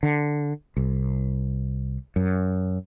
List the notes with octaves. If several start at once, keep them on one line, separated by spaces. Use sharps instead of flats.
D3
C2
F#2